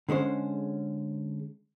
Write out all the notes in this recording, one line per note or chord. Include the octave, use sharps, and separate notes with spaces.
D3 G#3 C#4 C5